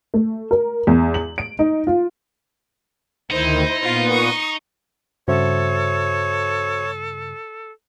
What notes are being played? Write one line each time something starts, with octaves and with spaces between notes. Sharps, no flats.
A3
A#4
E2
F#7
D7
D#4
F4
D2 D#3 D#4 E4 C5
A#2 B3 F4
C#6 D#6
G2 C#3 F#4 A4 C5 C#5 E5